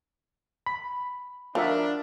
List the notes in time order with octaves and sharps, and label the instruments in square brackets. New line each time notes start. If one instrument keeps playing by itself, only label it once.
[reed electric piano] B5
[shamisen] F3 [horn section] D4 [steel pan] F#4 A#4 E5